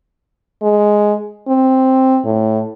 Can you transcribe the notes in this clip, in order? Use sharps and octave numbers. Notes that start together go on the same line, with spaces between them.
G#3
C4
A2